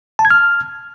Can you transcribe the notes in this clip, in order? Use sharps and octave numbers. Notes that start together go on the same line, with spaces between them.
A5
G#6
F6